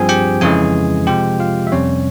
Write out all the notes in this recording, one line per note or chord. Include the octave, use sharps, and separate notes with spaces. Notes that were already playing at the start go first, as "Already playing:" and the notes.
Already playing: G2 F3 C4 G#4 G#5
G4 G5
F2 C#3 E3 G#3 G#4 G#5
C3 F3 G#3 G4 G5
F4 F5
E5
F2 C3 G3 C#4 C#5